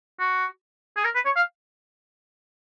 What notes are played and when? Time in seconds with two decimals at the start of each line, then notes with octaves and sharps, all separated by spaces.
0.20 F#4
0.97 G#4
1.05 A#4
1.15 B4
1.25 C#5
1.36 F5